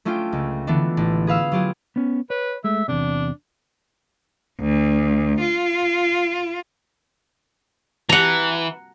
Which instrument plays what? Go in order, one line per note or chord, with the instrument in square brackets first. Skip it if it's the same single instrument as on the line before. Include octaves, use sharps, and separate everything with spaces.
[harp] A3 C#4 D4 F4 G5
C#2
D3 E3 A3 B3 D4
A1
G#4 B4 F5 E6
F#3 F4 G4 G#4
[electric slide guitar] B3 C#4
[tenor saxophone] B4 [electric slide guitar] C#5
[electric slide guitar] G#3 A3 [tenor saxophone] E5
[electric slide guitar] E2 G2 C3 [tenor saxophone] D4
[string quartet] D2
F4
[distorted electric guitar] E3 [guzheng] F#5 A#5